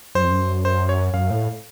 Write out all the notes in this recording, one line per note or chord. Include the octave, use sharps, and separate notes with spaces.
F#2 C5
F2
F#2
C5
C#5
F#2 F5
A2